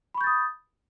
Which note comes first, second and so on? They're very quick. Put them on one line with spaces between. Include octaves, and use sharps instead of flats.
B5 C#6 G6 A6 D#6